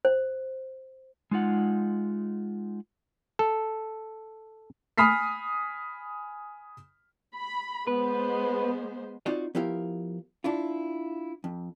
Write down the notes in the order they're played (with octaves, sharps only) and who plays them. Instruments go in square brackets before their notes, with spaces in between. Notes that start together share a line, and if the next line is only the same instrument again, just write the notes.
[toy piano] C5
[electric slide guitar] G#3 D#4 F4 F#5
[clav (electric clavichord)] A4
[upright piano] G#5 B5 D#6 F6 B6 C7
[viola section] B5
[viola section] G#3 B3 C5 [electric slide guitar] B4
[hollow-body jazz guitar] C4 D#4 F4 F#4 D5 D#5
F3 B3 E4 G4 A#4 F5
D4 E4 F4
F2